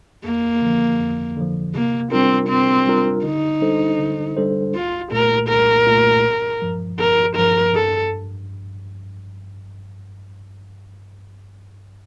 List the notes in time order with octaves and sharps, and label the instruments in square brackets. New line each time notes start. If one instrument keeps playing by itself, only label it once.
[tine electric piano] F2 [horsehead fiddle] A#3
[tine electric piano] D3 F3
F2
D3 F3
[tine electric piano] C3 [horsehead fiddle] A#3
[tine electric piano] G3 D4 F4 A#4 [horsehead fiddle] C4
[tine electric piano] C3 [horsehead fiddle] C4
[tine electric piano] G3 D4 F4 A#4
[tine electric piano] D3 [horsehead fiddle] D#4
[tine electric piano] G3 D4 A4 C5
D3
G3 D4 A4 C5
[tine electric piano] C2 [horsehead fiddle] F4
[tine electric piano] A#2 A3 [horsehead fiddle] A#4
[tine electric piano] C2 [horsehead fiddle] A#4
[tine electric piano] A#2 A3
G1
G2 F3
[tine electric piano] G1 [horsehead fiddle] A#4
[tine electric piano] G2 F3 [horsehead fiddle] A#4
[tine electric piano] G2 [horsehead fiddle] A4